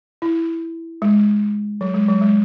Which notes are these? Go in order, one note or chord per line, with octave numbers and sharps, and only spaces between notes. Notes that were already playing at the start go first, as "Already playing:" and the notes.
E4
G#3
F#3
G#3
F#3
G#3